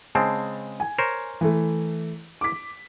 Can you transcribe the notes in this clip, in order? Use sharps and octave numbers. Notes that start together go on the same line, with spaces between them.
C#3 G#3 C4 A5
G#5
A#4 C5 C#5
E3 A3
D6 B6